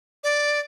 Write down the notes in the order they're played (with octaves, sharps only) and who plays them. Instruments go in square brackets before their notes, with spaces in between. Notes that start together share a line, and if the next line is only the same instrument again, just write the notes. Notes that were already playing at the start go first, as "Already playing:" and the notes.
[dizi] D5